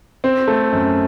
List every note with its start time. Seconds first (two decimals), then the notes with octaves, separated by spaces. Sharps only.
0.24 C4
0.48 A3
0.72 F#2